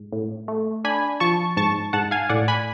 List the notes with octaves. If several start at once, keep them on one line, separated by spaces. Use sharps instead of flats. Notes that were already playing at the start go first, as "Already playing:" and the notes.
Already playing: G#2
A2
A3
D4 G#5 B5
F3 A5 C#6
G#2 A5 C#6
G#2 F#5 A5
F5 G#5
A2 D5 F#5
G#5 B5